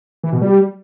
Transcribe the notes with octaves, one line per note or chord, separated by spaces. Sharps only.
E3
B2
G3